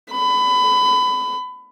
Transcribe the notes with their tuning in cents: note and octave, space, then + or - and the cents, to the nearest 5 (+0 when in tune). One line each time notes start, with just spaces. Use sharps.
B5 +25